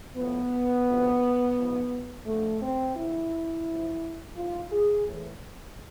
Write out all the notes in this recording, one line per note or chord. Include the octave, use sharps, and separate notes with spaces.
A2 F3 B3
D2 C3 F3
G#2 F3
F2 D3 F3 A3
C4
E2 D3 F3 E4
D2 C3 F3
G#2 E3 F4
G#4
A2 E3